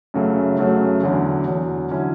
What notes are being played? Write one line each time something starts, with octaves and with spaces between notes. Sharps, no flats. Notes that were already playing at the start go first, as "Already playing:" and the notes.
F#2 C#3 F#3 A3
F#2 C#3 F#3 A3
E2 D3 F#3
E2 D3 F#3
D3 F#3 C#4 E4